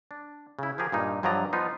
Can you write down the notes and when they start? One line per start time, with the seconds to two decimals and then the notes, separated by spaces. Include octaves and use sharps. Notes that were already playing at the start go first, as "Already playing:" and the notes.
0.11 D4
0.59 C#3 E4
0.78 F3 G4 G#4 A#4
0.92 G2 A#2 D#4
1.23 G2 F3 F#3 D5 D#5 A#5
1.53 F3 B3 D#4 F4